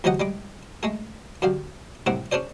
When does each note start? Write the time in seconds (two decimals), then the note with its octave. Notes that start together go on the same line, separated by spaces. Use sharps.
0.04 D2 F3 F#3 G4 D#5 F#5
0.20 G3 G#3 D6
0.83 G#3 A3 G#4
1.42 F#2 D3 G4 F5
2.06 C2 A2 D#3 C4 F#5 D6
2.32 C#4 D4 G#4 C5 D5